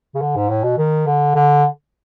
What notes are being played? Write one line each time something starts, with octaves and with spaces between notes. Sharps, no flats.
C#3
D3
G#2
A2
B2
D#3
D3
D3